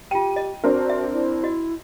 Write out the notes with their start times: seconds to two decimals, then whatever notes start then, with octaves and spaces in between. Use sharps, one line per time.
0.11 F4 G4 G5 D#7
0.36 D#5
0.64 C4 D4 F#4 A#4
0.89 E5
1.13 E4
1.43 F#4 D#5